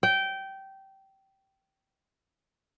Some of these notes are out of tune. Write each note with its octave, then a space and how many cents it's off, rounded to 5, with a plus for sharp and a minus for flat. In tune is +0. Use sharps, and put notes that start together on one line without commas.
G5 -15